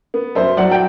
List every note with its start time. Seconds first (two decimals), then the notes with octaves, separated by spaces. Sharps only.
0.14 B3
0.35 F#2 C5 E5
0.57 F#3 D5 F#5
0.71 G5